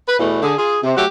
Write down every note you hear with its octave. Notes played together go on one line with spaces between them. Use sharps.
B4
E2 B2 E3 A3
D3 G#4
F4 G#4
C3
F#3 A3 F#4 G4